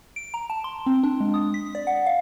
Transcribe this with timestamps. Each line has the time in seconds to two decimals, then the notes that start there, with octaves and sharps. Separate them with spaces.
0.16 D7
0.34 A#5
0.50 A5
0.64 C6
0.86 C4
1.03 D4
1.20 G#3
1.34 D#6
1.54 B6
1.75 D5
1.87 F#5
2.06 F5